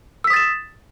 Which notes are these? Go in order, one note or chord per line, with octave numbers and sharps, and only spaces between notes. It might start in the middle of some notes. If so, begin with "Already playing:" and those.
D#6 E6 A6 B6 E7